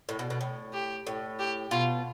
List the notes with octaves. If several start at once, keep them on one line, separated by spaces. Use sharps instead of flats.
A2
B2
B2
A2
G4
A2
G4
B2 F4